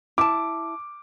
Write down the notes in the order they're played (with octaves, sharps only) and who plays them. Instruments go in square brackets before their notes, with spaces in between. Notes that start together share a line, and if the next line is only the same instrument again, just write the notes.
[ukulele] E4 A5 [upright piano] D6